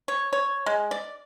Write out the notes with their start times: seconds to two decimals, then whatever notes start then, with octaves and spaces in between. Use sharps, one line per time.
0.08 C#5
0.33 C#5
0.66 G#3
0.91 D5